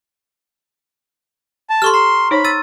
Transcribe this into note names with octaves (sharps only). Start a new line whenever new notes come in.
A5
G4 A4 C6 C#6 F6
A#5 C6
D#4 C5 C#5 B5
E6 A6 D#7